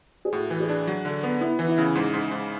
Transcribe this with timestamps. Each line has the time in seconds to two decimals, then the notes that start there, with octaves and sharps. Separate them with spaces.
0.25 G#4
0.33 A2 F#4
0.50 E3
0.60 G#4
0.69 D4
0.87 F#3
1.05 D3
1.23 B3
1.40 B3 E4
1.59 E3
1.68 E4
1.78 C#3
1.95 G#2
2.13 G#2
2.31 G#2